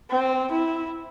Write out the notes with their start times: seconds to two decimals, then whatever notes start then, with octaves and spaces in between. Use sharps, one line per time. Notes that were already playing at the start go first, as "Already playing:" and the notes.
0.11 C4
0.51 E4